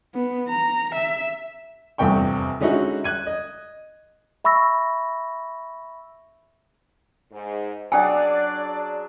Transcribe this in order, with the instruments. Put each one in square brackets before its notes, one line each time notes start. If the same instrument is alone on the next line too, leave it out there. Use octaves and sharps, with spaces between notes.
[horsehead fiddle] B3
A#5
E5
[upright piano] F1 E2 G2 C3 G5 C#6
D3 G#3 C#4 D#4 E4 F#4
F#6 G#6 D#7
D#5
[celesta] E5 B5 C#6 E6 A#6
[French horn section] G#2
[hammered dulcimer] F#3 D4 G#4 [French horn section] D5 [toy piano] G5 G#5